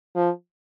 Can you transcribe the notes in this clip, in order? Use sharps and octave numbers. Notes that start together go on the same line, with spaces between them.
F3